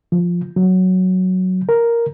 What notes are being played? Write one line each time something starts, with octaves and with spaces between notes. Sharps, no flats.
F3
F#3
A#4